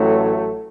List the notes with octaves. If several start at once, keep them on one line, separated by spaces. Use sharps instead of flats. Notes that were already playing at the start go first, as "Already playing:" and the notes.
Already playing: A1 A2 F#3 A3